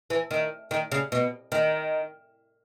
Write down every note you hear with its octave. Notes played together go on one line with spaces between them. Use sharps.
E3
D#3
D#3
C#3
B2
D#3